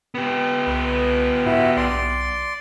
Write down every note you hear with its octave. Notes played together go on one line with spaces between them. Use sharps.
B3 G4
C2 B4
G#2 E4 F#4
B1 D5 C6